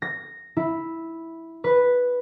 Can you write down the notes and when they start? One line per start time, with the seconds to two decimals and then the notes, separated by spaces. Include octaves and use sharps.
0.02 A#6
0.57 E4
1.64 B4